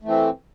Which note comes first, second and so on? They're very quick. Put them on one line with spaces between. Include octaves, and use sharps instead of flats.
A3 E3 C4